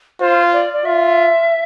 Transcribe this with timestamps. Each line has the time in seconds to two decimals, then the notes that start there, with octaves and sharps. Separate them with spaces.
0.20 F4 C5
0.53 D5
0.73 D5
0.85 F4 E5